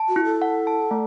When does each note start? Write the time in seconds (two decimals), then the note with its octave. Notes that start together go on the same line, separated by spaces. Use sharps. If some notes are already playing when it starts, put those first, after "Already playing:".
Already playing: A5
0.09 F#4
0.16 E4
0.25 A4
0.42 F#5
0.67 A5
0.91 A3